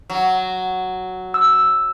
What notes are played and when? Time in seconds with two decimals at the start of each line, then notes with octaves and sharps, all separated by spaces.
0.10 F#3
1.34 E6